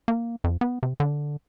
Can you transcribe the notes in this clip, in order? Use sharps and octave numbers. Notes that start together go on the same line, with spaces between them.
A#3
F2
B3
C3
D3